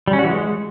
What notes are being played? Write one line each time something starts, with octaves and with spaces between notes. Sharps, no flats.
G3
C#4
F#4
E3
G#3